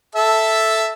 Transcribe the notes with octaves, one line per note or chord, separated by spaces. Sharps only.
A4 E5 A5